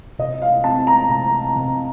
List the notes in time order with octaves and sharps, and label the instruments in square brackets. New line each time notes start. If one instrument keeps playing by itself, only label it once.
[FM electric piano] C3 [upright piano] D#5
[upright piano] F5
[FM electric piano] C4 [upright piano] A5
[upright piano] A#5
[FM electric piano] C3 [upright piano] A#5
[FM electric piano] C3 [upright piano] A5